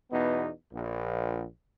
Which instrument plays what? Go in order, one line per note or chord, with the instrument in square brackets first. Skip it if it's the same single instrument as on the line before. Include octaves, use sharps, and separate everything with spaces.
[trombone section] E2 B2 B3 D#4
A#1